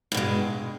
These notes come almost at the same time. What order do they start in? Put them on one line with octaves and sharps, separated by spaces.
G2 B2 G#3